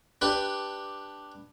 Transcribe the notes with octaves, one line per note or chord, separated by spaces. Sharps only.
D4 G4 B4